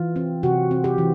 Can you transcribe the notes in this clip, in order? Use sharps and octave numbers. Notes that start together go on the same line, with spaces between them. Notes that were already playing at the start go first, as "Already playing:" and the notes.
Already playing: E3 F4
C4
C3 F#4
C4
G4
E3